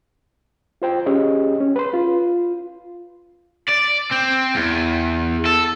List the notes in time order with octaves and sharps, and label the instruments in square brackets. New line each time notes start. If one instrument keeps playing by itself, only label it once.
[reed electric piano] F4 C5 G5
C#4 G4 G#4 D#5
C#4
B4 C6
F4
[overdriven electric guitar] D5
C4
E2
A4